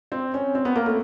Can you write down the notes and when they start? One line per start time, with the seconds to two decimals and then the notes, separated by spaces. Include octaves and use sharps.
0.12 C4
0.34 C#4
0.55 C4
0.65 B3
0.75 A#3
0.86 A3